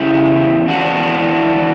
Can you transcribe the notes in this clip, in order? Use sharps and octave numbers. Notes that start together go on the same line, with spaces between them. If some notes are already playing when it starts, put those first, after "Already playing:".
Already playing: C#3 E4 G4
E2
E2 D4 F#4
E3
E3